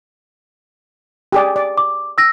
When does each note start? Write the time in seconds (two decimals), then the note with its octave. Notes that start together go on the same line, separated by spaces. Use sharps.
1.32 G4 G#4 D5
1.56 D5
1.78 D6
2.18 E6 A#6